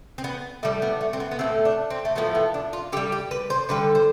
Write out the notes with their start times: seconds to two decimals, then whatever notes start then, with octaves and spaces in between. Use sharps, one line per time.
0.18 C4
0.24 B3
0.63 A2 G3 A3
0.82 B3
1.01 A3
1.13 C4
1.20 B3
1.31 B3
1.39 F3 A3 C4
1.43 A2
1.65 D4
1.90 C4
2.05 A3
2.15 A2 F3 A3 B3
2.35 B3
2.54 D4
2.73 F4
2.92 D3 G4
2.97 G3
3.12 G4
3.31 B4
3.50 C5
3.69 D3 G3 B4
3.95 C5